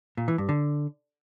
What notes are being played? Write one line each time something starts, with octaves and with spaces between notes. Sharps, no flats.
A#2
E3
G2
D3